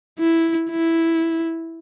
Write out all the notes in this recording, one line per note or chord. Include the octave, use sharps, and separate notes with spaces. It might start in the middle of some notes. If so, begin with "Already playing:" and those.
E4
E4